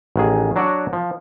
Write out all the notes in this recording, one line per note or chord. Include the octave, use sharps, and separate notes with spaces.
A1 D#3 G#4
F#3 D4 F#4 C#5 D5 F#5
F3